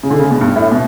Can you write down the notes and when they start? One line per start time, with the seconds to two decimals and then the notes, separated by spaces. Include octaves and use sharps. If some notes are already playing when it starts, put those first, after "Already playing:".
0.03 C#3
0.10 D3
0.19 C#3
0.31 B2
0.41 G2
0.56 A2
0.71 B2